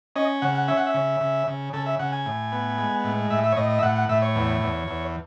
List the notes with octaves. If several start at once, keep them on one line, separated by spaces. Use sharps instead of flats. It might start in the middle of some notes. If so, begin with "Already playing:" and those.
C#4 D#5
C#3 F#5
F#5
C#4 E5
F#5
E5
C#3
C#3
C#3
C#3 A4
E5
C#3 F#5
G#5
A2
B3
G#3
A2
A2 E5
E5
C#5
A2 D#5
D#5
E5
A2 F#5
F#5
A2 E5
C#5
E2
E2
E2